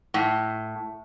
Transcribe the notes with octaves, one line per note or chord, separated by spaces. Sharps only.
A2